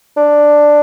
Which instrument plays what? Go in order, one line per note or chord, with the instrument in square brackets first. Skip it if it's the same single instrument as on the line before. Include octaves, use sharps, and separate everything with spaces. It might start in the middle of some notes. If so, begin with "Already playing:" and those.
[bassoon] D4